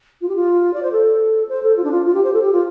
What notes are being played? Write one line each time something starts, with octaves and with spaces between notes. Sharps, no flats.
F4
G4
F4
D5
C5
A4
C5
A4
F4
D4
F4
F4
G4
C5
A4
G4
F4